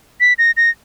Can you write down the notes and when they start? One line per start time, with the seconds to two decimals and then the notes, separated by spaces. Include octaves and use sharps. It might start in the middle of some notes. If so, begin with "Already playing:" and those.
0.20 B6
0.38 A#6
0.57 A#6